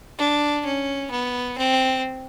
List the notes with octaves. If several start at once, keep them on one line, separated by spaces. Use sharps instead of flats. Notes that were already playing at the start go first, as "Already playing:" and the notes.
D4
C#4
B3
C4